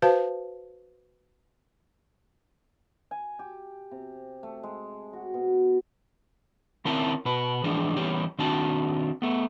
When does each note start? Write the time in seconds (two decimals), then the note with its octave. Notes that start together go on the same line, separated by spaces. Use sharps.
0.02 F#4 B4 C5 F5 A5
3.11 G#5
3.39 G4
3.91 C3
4.43 A3
4.63 G#3
5.13 F#4
5.34 B2
6.85 D#3 C4 C#4 E4 A#4 A5
7.25 B2 B4
7.64 E3 F3 G#3 D4
7.96 E3 G3 B3 C#4 G4
8.39 D#3 C4 D4 F#4 A5
9.22 A3 B3